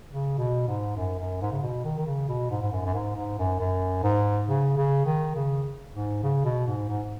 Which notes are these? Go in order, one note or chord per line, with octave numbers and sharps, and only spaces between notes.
C#3
B2
G#2
F#2
F#2
G#2
C#3
B2
D#3
D#3
C#3
B2
G#2
G#2
F#2
F#2
G#2
G#2
F#2
F#2
G#2
C#3
C#3
D#3
C#3
G#2
C#3
B2
G#2
G#2